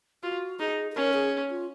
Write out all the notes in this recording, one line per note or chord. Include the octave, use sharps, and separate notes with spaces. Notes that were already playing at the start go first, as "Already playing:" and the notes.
F4 F#4
D#4 G#4
G#4
C#4 A#4
G#4
F4